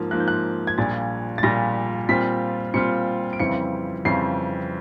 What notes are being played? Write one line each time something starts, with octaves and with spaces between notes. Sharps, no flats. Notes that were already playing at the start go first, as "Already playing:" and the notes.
Already playing: G#2 F3 A#3
G#2 F3 A#3 F#6
G6
F#6
G#6
A#1 A#2 G3 A6
A6
A#1 A#2 G3 A#6
A#2 G3 C4 F4 B6
A#2 G3 C4 F4 C#7
D7
F2 C#3 E3 G3 C4 C#7
F2 C#3 E3 G3 C4 C7